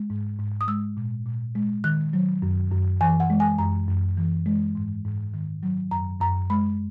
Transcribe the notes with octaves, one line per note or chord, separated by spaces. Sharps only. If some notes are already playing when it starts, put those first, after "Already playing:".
Already playing: G#3
G#2
G#2
D#6
G#3 E6
A#2
A#2
G#3
D#3 F#6
F#3
F#2
F#2
E3 G#5
F#5
G#3
G#5
F#2 A#5
F#2
E3
G#3
G#2
G#2
D#3
F#3
F#2 A#5
F#2 A#5
G#3 B5